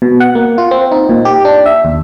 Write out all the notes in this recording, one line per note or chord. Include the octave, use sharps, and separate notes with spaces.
B2
F#5
A#3
F4
C4
D#4
A#2
G4
D4
E5
D#2